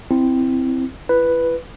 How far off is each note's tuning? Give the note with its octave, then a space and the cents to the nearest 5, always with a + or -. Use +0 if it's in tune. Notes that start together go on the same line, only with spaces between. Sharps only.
C4 -5 E4 +0
E4 +40 B4 +0